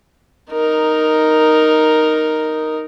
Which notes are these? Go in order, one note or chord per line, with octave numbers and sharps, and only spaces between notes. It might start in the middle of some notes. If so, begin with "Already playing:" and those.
D#4 A#4